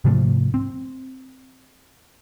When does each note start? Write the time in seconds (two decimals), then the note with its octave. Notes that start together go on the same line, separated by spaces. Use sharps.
0.04 G#2 C3 F3 A3
0.54 C4